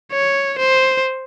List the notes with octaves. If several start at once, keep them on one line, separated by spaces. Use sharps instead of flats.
C#5
C5